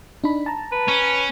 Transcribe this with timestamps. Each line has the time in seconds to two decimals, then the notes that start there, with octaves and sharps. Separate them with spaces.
0.24 D4 D#4 B5
0.46 A5 A#5
0.72 B4
0.88 C#4